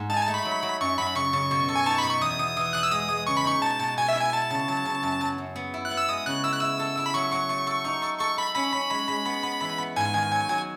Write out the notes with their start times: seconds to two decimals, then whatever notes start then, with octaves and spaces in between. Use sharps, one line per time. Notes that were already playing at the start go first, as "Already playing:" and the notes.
Already playing: G#2
0.10 D#4 A5
0.17 G#5
0.22 A5
0.28 A3
0.34 B5
0.45 F#3
0.63 F#3
0.81 F#2 C#6
0.98 F#2 B5
1.15 C#3 C#6
1.33 C#3
1.51 B2
1.68 A4
1.76 G#5
1.86 D#4 A5
1.98 B5
2.03 B2
2.09 C#6
2.21 E2 D#6
2.39 E2
2.57 E3
2.73 E2 F#6
2.83 E6
2.91 G#3 D#6
3.10 G#3
3.27 C#3 C#6
3.37 B5
3.44 D#4 C#6
3.62 B2 A5
3.80 B2
3.98 B2 G#5
4.09 E5
4.15 E4
4.21 G#5
4.33 B3 A5
4.50 C#3
4.68 F#3
4.85 C#3
5.03 F#2
5.21 F#3
5.38 F#2
5.56 B3
5.74 E4
5.85 F#6
5.91 B3
5.97 E6
6.08 G#3 D#6
6.26 C#3 F#6
6.44 E4 E6
6.52 F#6
6.61 E4 E6
6.79 A4
6.97 E4
7.06 B5
7.14 F#3 C#6
7.32 F#3
7.50 A3
7.67 A4
7.85 D#4
8.03 A4
8.19 A4 C#6
8.37 A4 B5
8.55 C#4 B5
8.73 C#4
8.91 G#3
9.08 G#3
9.26 B3
9.43 B3
9.61 E3
9.79 B3
9.96 G#2 G#5
10.14 D#3
10.31 F#3
10.49 F#3